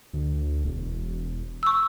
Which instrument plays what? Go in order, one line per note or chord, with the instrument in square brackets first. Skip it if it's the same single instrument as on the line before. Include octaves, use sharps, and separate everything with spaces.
[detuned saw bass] D2
E1
[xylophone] C#6 E6